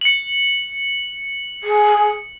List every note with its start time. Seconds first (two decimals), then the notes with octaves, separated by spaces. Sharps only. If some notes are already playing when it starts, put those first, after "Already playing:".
0.01 C#7 F#7
1.64 G#4